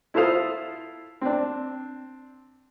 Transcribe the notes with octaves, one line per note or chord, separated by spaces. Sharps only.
E4 F4 A4 C5 F5 D#6
C4 D4